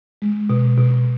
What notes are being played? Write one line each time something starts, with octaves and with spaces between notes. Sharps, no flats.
G#3
B2
B2